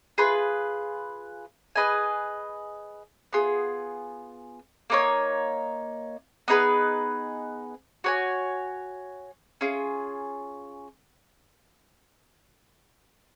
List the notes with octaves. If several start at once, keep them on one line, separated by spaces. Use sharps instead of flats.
F4 G#4 B4
G#4 B4 D#5 G#5
B3 F4 G#4
A#3 D#4 A#4 C#5
B3 D#4 G#4 B4
F#4 C#5 G#5
C#4 F4 G#4